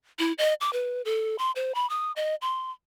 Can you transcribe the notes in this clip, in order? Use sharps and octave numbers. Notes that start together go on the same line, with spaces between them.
E4
D#5
D6
B4
A4
C6
C5
B5
D#6
D#5
C6